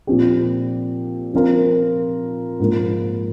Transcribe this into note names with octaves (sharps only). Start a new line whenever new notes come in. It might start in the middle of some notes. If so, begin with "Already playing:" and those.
A#2 F3 C4 G4
F3 C4 F4 A#4
G#2 F3 A#3